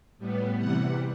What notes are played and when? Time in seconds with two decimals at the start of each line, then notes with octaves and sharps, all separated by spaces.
0.18 A2 G3 B3
0.59 C3 E3 G3 F#5